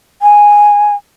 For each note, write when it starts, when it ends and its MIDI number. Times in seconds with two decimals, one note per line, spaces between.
0.22 0.95 80